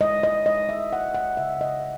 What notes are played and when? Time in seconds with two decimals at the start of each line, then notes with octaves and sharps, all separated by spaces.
0.01 G#3 D#5
0.23 D#5
0.46 G#3 D#5
0.69 E5
0.92 G#3 F#5
1.15 F#5
1.37 C#3 E5
1.61 D#5